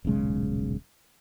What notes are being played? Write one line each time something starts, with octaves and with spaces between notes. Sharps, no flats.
D#1 B1 C#3 G#3